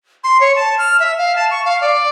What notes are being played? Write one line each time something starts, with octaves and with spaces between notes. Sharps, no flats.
C6
C#5
A5
F6
E5
F5
A5
C#6
F5
D5